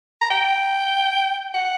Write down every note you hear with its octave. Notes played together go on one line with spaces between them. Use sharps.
A#5
G5
F#5